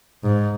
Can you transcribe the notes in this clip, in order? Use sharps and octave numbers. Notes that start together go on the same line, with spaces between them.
G#2